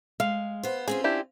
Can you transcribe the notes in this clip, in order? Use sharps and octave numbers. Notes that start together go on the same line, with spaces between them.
G#3 F5
B3 C5
C4 C#4 F4 G#4
D4 E4 G4